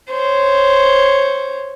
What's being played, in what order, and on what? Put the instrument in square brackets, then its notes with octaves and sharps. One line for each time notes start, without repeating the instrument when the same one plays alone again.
[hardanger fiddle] C5 C#5